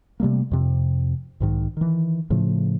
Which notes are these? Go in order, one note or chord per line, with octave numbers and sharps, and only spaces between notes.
C3 G3 A3 A#3
F2 C3
B1 G#2 D#3
D#3 E3
A2 C#3 F3 A3